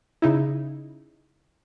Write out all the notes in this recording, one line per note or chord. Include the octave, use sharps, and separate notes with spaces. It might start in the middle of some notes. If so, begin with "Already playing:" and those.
C#3 D#4 E4